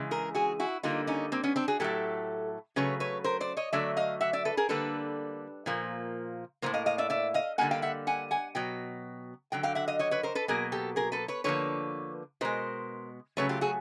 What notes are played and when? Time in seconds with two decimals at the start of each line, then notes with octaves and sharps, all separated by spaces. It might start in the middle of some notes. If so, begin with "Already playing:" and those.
Already playing: C#3 E3 G#3
0.11 G#4 A#4
0.35 F#4 G#4
0.60 E4 F#4
0.83 D3 G3 A#3 D#4 F4
1.07 C#4 D#4
1.32 A#3 C4
1.44 B3 C#4
1.56 C4 D4
1.68 F#4 G#4
1.80 A2 F#3 A3 G4 A4
2.76 C#3 F#3 A3 B4 C#5
3.00 B4 C#5
3.24 A#4 C5
3.40 C5 D5
3.57 C#5 D#5
3.73 D3 F#3 A3 D5 E5
3.97 D#5 F5
4.21 E5 F#5
4.33 D5 E5
4.45 A4 B4
4.57 G#4 A#4
4.69 D3 G3 A#3 A4 B4
5.66 A#2 F3 A#3
6.62 A2 F#3 A#3 A#4 C5
6.74 D#5 F5
6.86 D#5 F5
6.98 D5 E5
7.10 D5 E5
7.34 D#5 F5
7.58 D3 G3 A#3 F#5 G#5
7.71 F5 G5
7.82 E5 F#5
8.07 F#5 G#5
8.31 F#5 G#5
8.55 B2 F#3 G5
9.52 D3 F#3 G5
9.63 F5 G5
9.75 E5 F#5
9.88 D#5 F5
9.99 C#5 D#5
10.11 B4 C#5
10.23 A#4 C5
10.35 A4 B4
10.48 B2 F#3 A#3 G#4 A#4
10.72 G4 A4
10.96 G#4 A#4
11.12 A4 B4
11.28 B4 C#5
11.44 D3 F3 A#3 B4 C#5
12.41 B2 G#3 A#4 C5
13.37 C#3 F#3 A3 B4 C#5
13.49 F4 G4
13.61 F#4 G#4